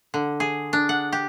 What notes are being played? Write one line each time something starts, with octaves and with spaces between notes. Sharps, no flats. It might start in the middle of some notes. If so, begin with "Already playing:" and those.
D3
G#4
D4
F#5
G4